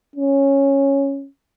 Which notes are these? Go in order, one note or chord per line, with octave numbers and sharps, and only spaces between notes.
C#4